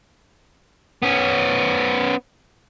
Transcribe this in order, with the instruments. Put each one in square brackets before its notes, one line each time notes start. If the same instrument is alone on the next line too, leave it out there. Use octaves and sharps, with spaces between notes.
[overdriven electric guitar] B3 C#4